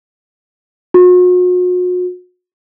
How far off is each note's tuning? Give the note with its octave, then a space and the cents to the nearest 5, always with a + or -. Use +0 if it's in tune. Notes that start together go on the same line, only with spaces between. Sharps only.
F#4 -40